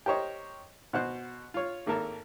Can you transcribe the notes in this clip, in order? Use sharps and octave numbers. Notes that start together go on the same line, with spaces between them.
G4 A#4 C5 C#5 D#5
B2 F#4 C5 F#6
F4 C#5
G#1 A#3 A4 A#4 A5